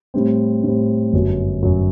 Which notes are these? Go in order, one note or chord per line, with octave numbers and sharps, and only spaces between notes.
A2 G3 C4
A2 G3 C4
G1 F#2 F#3
F#2 F#3